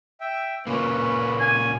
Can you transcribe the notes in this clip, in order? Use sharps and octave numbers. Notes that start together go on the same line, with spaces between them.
E5 G5
A#2 C#3 A#3 C#4 B4
G#5